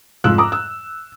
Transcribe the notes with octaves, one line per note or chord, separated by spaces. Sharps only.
F2 G#2 F4 E6 F#6
A#5 D6
E6